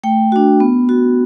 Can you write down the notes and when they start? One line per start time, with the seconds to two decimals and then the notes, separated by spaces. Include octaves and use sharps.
0.03 A3 G5
0.32 D4 F#4
0.60 B3
0.89 F#4